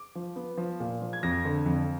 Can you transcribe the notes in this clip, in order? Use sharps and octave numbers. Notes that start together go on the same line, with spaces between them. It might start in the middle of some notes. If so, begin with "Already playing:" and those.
Already playing: D6
F3
B3
F3
A#2
F3
G#6
F2 A#6
D3
F2